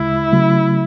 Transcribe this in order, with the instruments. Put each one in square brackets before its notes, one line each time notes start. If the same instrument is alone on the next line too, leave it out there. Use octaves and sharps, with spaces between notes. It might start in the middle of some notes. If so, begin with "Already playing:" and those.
Already playing: [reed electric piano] D2 C#3 G#3 [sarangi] E4
[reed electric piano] C#3 F#3 A3